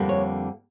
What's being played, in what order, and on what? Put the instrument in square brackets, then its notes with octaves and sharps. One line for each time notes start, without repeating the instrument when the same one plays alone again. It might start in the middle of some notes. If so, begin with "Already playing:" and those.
Already playing: [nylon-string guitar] F2 D3 G3 A#3
C#5